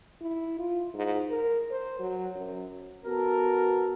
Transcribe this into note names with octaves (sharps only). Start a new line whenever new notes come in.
E4
F4
G#2
A#4
C5
F#3
F#2
B3 F#4 A4 A#4